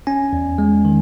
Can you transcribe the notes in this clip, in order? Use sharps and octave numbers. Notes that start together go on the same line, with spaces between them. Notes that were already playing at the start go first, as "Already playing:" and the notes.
C#4 G#5
E2
G#3
D#3